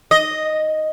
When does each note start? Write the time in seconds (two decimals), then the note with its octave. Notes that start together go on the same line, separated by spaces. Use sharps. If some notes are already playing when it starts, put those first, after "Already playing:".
0.11 D#5